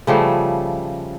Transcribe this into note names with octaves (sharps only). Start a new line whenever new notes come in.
C#3 F3 G3 A3